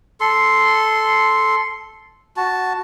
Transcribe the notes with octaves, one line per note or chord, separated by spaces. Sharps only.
A4 C6
F#4 A5